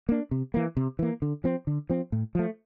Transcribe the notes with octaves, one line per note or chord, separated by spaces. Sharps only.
A#3 D4
C3
E3 A#3
C3
E3 A#3
D3
F3 C4
D3
F3 C4
A2
F3 A3